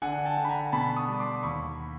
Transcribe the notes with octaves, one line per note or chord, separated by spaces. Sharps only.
D3 F#5 G#5
G5 A5
D3
B5
G#5 A#5
B2 A5 B5
C#6 D#6
G3
C6 D6
D#2 B5 C#6